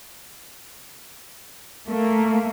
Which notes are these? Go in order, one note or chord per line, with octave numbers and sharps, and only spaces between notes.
A3 A#3